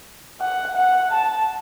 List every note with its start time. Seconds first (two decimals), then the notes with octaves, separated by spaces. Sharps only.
0.41 F#5
0.75 F#5
1.12 A5